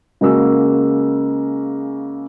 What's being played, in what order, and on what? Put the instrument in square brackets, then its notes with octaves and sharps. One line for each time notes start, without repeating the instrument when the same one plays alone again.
[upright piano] C#3 G#3 A#3 F#4 E6